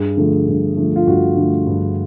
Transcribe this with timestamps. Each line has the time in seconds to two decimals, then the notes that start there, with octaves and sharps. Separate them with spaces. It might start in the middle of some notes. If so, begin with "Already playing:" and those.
Already playing: G2 G#4
0.17 D3 F3 A3
0.48 G2
0.77 D3 F3 A3
0.96 F4
1.07 G2 F#4
1.37 D3 F3 A3
1.67 G2